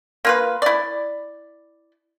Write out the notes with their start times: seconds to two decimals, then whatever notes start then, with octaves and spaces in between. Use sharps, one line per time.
0.25 A#3 F4 B4
0.62 E4 D5